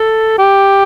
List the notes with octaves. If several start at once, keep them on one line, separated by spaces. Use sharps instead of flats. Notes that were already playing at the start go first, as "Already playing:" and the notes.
Already playing: A4
G4